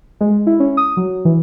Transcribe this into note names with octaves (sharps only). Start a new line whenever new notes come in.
G#3
E4
C#4
D#6
F#3
E3